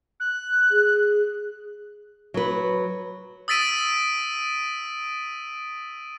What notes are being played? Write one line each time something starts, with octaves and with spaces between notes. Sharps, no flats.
F#6
G#4
F#3 B4
D#6 E6 A6 B6 D7 D#7